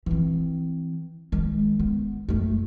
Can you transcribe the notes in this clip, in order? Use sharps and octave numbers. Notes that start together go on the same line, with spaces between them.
E3 C4
D#3 G#3
B3
F#1 A3